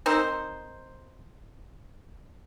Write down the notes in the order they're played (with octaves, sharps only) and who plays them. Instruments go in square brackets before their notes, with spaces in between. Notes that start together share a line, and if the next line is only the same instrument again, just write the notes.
[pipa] C4 D#4 A#4 C5